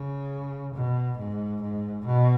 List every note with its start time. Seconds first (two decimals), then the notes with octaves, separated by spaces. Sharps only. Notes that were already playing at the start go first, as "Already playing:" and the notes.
Already playing: C#3
0.74 B2
1.18 G#2
1.62 G#2
2.05 B2